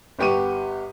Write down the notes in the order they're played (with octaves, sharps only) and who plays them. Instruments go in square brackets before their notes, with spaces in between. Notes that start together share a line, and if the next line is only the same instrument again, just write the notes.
[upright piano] G1 B3 G4 C#6 D#7